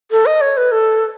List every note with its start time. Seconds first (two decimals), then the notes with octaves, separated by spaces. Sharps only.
0.11 A4
0.26 D#5
0.41 C#5
0.57 B4
0.71 A4